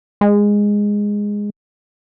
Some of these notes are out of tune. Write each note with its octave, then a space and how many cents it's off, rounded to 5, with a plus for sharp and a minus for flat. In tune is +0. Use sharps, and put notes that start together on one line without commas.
G#3 -10